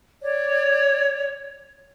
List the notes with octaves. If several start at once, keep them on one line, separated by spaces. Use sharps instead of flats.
C#5 D5